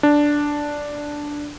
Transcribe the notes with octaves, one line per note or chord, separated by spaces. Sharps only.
D4